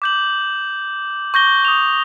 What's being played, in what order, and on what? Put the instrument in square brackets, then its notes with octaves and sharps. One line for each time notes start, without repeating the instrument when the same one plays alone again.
[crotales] D6 G6 F#7
C#6 G6 A#6 G7
D#6 F7